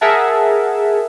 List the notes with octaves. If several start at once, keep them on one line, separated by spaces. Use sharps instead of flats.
G#4 A#4 E5 F#5 A5